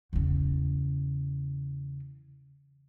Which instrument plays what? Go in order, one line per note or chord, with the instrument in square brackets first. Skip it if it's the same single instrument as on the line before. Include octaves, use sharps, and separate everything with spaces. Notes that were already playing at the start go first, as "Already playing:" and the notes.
[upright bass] E2 C#3